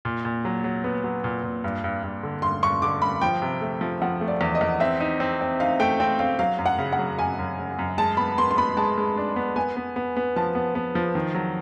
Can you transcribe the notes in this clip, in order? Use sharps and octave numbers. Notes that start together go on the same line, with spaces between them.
A#2
A#2
F#3
F#3
B3
F#3
A#2
A#2
G2
G2
G2
D3
G2 C6
G2 C#6
D3 D6
G2 B5
F3 G5
C3
A3
F3
F3 F#5
A3
D5
E2
D#5
E2
C4 E5
D#4
C4
C4
D#4 F5
A3 G5
C4 G5
C4 F5
F#3 F5
F#2
F#5
C#3
F#5
F#3
F#2 G#5
F#2
C#3
F#2
G#3 A5
B3 B5
B3 C6
C6
B3 B5
G#3 A5
G#3
D4
B3
B3 G#5
B3
B3
B3
F3 A5
B3
B3
F3
D#3
F#3